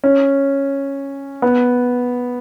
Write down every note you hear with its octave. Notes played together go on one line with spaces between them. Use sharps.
C#4
B3